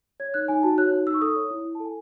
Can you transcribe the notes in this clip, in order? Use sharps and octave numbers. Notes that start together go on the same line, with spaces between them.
C#5 G#6
D#4 F#6
D#4 G#5
F#4 A5
C#5 F#6
D#4
D#4 E6
C#6
A4 D#6
C#5
E4
E4
A5
A4 G#5